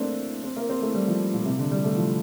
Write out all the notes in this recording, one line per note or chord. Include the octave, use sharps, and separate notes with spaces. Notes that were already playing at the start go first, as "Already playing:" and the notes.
Already playing: A3 A#3 C4 D4
C4
A#3
C4
A3
G3
F3
A#2
C3
D3
G3
A3
F3